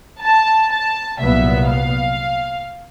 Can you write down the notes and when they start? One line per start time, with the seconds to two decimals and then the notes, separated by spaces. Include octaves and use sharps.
0.21 A5
0.69 A5
1.19 C2 A#2 F#3 B3 E5
1.67 F5